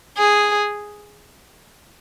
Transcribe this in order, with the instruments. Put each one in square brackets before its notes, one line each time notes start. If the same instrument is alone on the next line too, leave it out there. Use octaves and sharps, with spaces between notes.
[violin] G#4